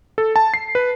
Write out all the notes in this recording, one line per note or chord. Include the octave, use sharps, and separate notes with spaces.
A4
A5
C7
B4